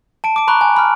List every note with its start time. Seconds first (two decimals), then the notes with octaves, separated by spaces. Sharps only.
0.24 A5 D7
0.36 D6 D7
0.48 A#5 B5 C#6 F#6
0.61 G#5
0.77 B5 F6